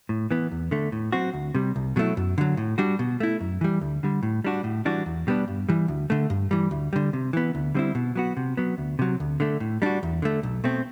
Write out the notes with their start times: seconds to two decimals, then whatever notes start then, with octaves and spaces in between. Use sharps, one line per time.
0.09 A2
0.31 E3 B3
0.52 E2
0.71 D3 A3
0.92 A2
1.12 F#3 C4 F#4
1.33 D2
1.55 C3 G3
1.76 C2
1.96 B2 F#3 A3 E4
2.17 F#2
2.38 D3 F#3
2.57 A2
2.78 G3 D4 F#4
2.99 B2
3.20 A3 E4
3.40 F#2
3.61 E3 G3
3.81 D2
4.03 D3 G3
4.23 A2
4.44 G3 D4 F#4
4.64 A2
4.85 E3 G3 D4 F#4
5.06 E2
5.27 B2 G3 B3 D4
5.48 G2
5.69 E3 G3
5.88 D2
6.10 D3 A3
6.30 G2
6.51 E3 G3
6.71 D2
6.93 D3 G3
7.13 C3
7.33 E3 B3
7.55 D2
7.75 D3 G3 C4 E4
7.95 B2
8.16 F#3 B3 F#4
8.37 C3
8.57 F#3 B3
8.78 D2
8.99 C3 F#3
9.20 D2
9.40 D3 A3
9.60 A2
9.82 G3 D4 F#4
10.03 E2
10.22 D3 A3
10.43 B1
10.64 B2 A3 C4